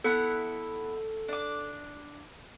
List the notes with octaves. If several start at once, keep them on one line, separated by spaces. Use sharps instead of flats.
B3 E4 A4 F#5
D4 D6